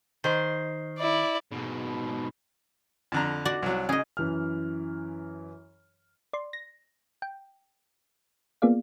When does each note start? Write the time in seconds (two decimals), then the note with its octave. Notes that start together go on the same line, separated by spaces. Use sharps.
0.24 D#3 C5
0.99 E4 D5
1.52 G#2 B2
3.12 F2 D3 A#5
3.45 F#4 D5
3.62 C2 F#3
3.89 C#3 G#4 D#5
4.17 F#2 E3 F6
6.33 D5 C6
6.53 A#6
7.22 G5
8.62 A#3 B3 F4 G#4 D5 F5